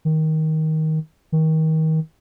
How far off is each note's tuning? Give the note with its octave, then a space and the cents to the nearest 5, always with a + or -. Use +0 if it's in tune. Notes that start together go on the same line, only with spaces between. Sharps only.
D#3 +15
D#3 +30